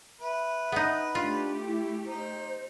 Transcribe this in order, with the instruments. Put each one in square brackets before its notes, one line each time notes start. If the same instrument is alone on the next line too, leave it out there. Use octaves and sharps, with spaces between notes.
[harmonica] B4 [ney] E5
[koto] B3 D#4
[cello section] A3 G4 [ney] D4 [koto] F4
[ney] E4
[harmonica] D#4 [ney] C5